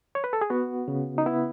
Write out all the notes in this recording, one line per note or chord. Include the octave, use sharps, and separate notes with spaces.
C#5
B4
A4
G#4
B3 F#4
C#3
D#4
B3 E4